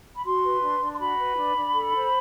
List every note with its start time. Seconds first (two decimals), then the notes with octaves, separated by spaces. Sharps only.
0.15 B5
0.24 F#4 C6
0.43 B4
0.61 D4
0.80 D4
0.93 C6
0.99 F#4 B5
1.18 B4
1.36 D4
1.55 D4
1.73 A4
1.93 C5